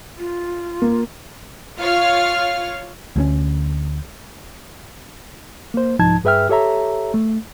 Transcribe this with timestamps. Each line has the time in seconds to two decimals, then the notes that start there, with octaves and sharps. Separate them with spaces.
0.19 F4
0.82 A#3
1.78 F4 C#5 F5 F6
3.16 D2 G#3 C#4
5.74 A#3 C5
5.99 C2 G#2 F3 D#4 A5 G#6
6.24 G2 G#4 B4 E5 G5 F6
6.49 G4 A4 C#5 E5 A#5
7.14 A3